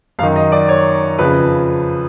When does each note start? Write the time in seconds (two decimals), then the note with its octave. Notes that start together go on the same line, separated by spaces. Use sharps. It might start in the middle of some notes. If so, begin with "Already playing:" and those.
0.19 F#2 F5
0.23 D#3
0.36 D#5
0.52 D5
0.69 C#5
1.18 F2 C#3 F3 B4